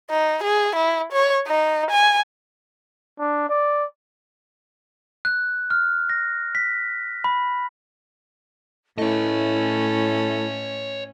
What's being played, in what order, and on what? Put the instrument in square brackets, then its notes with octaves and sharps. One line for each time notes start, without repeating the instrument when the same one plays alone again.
[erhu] D#4
G#4
E4
C#5
D#4
G#5
[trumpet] D4
D5
[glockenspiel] F#6
F6
A#6
B6
B5
[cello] A2 C#4 [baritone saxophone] A3 [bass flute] E4 [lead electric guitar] C#5 D#5